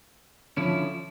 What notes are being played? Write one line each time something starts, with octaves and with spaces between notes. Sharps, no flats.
D3 F3 C#4 E4